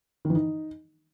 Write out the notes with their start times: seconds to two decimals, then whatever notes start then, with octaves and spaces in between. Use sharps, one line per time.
0.25 D#3
0.30 E3
0.35 D#4